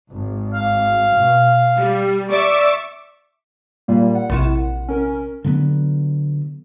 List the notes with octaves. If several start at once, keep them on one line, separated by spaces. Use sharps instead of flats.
G#1
F5
B2
G3
D5 E5 C#6 D6
A#2 G3 A#3
F#5
A#1 C3 E4
C#4 A#4
D3 F#3 A3 B3